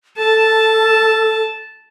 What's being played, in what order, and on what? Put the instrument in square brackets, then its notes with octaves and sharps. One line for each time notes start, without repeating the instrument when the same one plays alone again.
[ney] A4 [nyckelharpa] A5